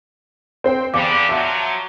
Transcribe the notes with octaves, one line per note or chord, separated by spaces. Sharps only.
C4 C5 G5
E2 D3 G3 F5 D6
F3 F#3 E5 A5